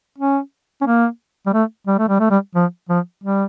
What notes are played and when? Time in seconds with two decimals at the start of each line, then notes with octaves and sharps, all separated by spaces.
0.18 C#4
0.81 C#4
0.86 A#3
1.46 G3
1.53 A3
1.87 G3
1.99 A3
2.08 G3
2.19 A3
2.30 G3
2.55 F3
2.89 F3
3.24 G3